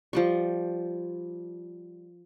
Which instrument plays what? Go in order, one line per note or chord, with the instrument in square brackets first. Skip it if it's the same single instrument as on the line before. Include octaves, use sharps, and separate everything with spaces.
[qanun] F3 G3 C#6